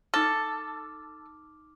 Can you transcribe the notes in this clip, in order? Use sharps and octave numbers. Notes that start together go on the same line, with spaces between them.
D#4 A4 D6 F6